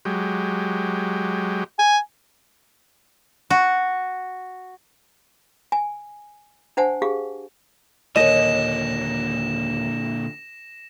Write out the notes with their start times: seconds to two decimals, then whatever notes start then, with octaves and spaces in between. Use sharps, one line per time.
0.05 F#3 G#3 G4
1.79 G#5
3.50 F#4
5.72 G#5
6.77 D4 C5 F#5 G#5 A5
7.02 G4 G#4 F5
8.16 D#2 A#2 D3 C#5 D#5 A#6 E7